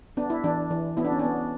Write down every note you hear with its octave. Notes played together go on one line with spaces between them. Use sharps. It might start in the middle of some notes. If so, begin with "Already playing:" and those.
B3 D4
E4
E3 D4
E3
B3 E4
D4
C#4
B3 D4